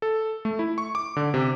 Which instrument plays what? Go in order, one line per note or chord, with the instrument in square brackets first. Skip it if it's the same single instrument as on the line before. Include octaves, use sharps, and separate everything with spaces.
[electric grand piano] A4
A3
E4
C#6
D6
D3
C3